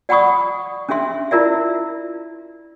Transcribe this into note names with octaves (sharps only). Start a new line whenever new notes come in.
D5 F#5 G5 B5 C#6 D#6
C#4 D4 G#4 E5 C6
E4 F4 A#4 D5 E5